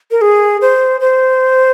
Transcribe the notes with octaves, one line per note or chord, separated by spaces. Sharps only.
A#4
G#4
C5
C5